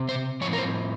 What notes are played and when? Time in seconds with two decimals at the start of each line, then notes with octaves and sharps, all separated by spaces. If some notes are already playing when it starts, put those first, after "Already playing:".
Already playing: C3 C4
0.09 C5
0.41 A2 F3 C4 C#5
0.53 A#4
0.58 C5